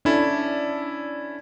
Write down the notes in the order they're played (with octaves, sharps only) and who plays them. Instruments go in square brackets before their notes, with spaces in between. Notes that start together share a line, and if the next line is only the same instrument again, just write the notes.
[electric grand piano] C#4 E4 A4 [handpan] D4